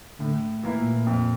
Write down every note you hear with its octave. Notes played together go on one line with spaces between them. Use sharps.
A2 D3
E3 A#3 E4
A#2
F2